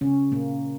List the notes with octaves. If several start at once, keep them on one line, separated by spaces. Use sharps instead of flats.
C#3 C#4
A#2 A#3